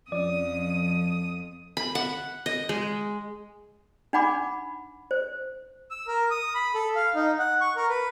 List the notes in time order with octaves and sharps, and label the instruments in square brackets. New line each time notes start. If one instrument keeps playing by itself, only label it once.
[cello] F2 [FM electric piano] F3 C#4 [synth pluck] D5 [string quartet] D#6
[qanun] B5
F#5
D#5
G#3
[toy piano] D4 D#4 F#5 G#5 B5 D6
C5
[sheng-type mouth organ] E6
A#4
D#6
B5
A4
F5
D#4
F#5
C#6
A#4
B4